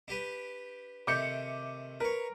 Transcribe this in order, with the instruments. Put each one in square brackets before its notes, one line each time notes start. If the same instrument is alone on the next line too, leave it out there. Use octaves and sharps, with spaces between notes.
[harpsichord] D4 G4 B4
[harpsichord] C3 D#3 A3 [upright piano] D6 G6 C#7
[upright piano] A#4 [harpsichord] B4 C#5